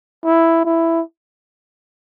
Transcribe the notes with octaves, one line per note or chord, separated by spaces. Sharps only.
E4
E4